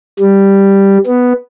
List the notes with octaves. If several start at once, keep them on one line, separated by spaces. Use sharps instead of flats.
G3
B3